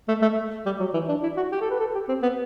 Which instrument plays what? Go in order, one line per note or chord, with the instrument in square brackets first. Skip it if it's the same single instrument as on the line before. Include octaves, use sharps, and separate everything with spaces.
[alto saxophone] A3
A3
G3
F#3
E3
D4
E4
F#4
G4
A4
B4
A4
G4
C4
B3